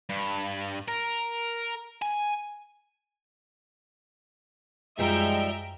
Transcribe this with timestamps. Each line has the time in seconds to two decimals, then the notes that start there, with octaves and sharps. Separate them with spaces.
0.10 G2
0.88 A#4
2.02 G#5
4.99 F#2 F3 G3 G#3 D#4 E5 G5 A#5